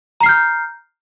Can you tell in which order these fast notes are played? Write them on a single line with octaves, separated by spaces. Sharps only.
A#5 C7 F6 G6